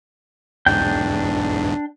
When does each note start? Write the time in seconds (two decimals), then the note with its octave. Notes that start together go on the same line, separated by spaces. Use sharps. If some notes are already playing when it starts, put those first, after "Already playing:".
0.66 B1 E2 G#2 D4 G5 G6